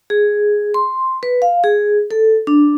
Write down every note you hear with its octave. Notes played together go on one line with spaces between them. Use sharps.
G#4
C6
B4
F5
G#4
A4
D4